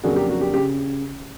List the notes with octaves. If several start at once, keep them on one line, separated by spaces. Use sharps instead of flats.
F2 C#3 F#3 A#3 D4 F#4 G#4
G4
F#4
G4
C#3 G4